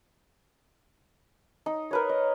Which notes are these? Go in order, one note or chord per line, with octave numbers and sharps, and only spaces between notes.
D#4
A#4 B4 C#5
D#5